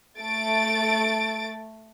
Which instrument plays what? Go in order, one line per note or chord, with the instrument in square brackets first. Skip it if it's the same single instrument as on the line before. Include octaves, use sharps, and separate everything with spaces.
[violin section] A3 A6 D7